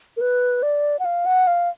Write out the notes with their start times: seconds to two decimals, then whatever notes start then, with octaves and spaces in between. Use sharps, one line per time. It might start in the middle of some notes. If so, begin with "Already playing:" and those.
0.17 A#4
0.21 B4
0.63 D5
0.99 F#5
1.05 F5
1.26 F#5
1.47 F5